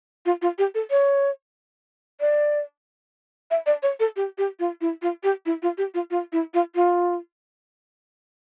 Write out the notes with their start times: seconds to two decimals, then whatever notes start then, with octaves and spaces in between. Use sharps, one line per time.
0.26 F4
0.42 F4
0.58 G4
0.75 A4
0.91 C#5
2.20 D5
3.51 E5
3.66 D5
3.83 C#5
4.00 A4
4.16 G4
4.38 G4
4.59 F4
4.81 E4
5.02 F4
5.23 G4
5.46 E4
5.63 F4
5.78 G4
5.94 F4
6.11 F4
6.33 E4
6.54 F4
6.75 F4